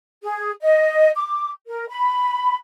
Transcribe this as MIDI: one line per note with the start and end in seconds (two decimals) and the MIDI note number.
0.23 0.50 68
0.62 1.10 75
1.15 1.49 86
1.67 1.85 70
1.88 2.55 83